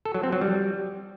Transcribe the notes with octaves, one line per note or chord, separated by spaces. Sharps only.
A4
F#3
C4
F#3
G3